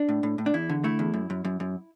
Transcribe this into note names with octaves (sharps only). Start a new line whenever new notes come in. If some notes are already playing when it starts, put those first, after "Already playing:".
Already playing: D4
A2
A2
A2
D4
E2 E4
D3
A3 E4
E2
F#2
F#2
F#2
F#2